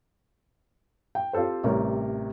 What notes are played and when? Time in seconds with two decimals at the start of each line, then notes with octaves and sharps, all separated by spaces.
1.15 G5
1.33 C4 F4 G4 A4 C5
1.64 A1 C3 G3 A#4 C#5